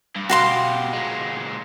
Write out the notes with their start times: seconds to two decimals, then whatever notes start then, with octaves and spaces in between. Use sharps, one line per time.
0.15 G2
0.29 B2 F#4 G4 F5 C6
0.93 A#2 G#3